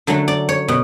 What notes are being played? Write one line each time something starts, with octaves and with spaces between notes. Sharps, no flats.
D3 F#3 A3
D5
C#5
B2